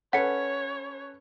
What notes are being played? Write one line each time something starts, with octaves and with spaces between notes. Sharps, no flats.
C#4 A4 B4 C#5 F#5 C#7